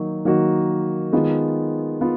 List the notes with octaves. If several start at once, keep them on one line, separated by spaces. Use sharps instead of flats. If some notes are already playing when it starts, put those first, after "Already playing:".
Already playing: D#3 F#3 A#3 D#4 F#4
D#3 F#3 A#3 D#4 F#4
D#3 G#3 B3 F4
B3 F4